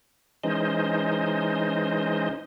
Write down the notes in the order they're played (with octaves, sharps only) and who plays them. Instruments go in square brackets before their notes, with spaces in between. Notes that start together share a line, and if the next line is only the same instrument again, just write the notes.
[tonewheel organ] E3 G#3 C#4 D#4 C5 D#5